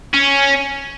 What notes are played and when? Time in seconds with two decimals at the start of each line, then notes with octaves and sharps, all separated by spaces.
0.14 C#4